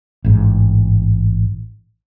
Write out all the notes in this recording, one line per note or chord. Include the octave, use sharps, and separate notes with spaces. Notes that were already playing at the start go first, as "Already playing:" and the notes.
A1 G#2